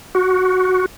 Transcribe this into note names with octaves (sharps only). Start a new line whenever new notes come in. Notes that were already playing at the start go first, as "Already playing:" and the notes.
F#4